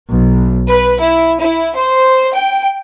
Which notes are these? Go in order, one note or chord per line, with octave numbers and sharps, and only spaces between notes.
B1
B4
E4
E4
C5
G5